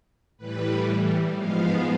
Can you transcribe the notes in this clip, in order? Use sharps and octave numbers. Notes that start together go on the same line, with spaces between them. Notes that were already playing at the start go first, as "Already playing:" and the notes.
A2 E3 G3 B4
G#2 F3 G#3 B3 F5